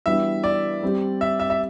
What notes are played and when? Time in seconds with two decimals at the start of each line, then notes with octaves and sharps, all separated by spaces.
0.06 E3 G3 B3 D4 F#4 E5
0.44 D5
0.83 G3 C4 G4
1.21 E5
1.40 E5
1.50 E5